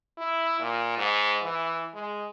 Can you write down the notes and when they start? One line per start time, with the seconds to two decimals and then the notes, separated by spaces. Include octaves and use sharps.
0.18 E4
0.60 A#2
0.98 G#2
1.43 E3
1.94 G#3